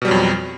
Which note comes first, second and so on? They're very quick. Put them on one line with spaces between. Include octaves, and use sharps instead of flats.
B2 G3 F#3 F2